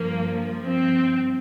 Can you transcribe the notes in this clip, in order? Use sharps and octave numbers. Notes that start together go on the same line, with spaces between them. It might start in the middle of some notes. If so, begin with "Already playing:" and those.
Already playing: G2 F3 A#3
C4